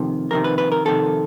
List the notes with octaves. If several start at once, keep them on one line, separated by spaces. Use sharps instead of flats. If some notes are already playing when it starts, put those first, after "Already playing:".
Already playing: F2 C3 D#3
F2 C3 D#3 A#4
B4
B4
A#4
F2 C3 D#3 A4